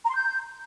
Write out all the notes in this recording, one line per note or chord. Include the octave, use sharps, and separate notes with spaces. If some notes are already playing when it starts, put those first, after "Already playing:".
A#5
C6
G6